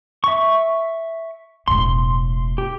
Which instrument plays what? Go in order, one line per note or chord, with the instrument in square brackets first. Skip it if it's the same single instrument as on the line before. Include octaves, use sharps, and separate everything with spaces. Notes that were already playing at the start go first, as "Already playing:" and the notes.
[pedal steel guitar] E5 C#6
[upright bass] E1 A2 [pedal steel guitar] C6
[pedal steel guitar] G4